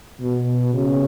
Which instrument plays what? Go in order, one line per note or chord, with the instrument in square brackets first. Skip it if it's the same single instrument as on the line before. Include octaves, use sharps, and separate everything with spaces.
[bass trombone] B2
C#3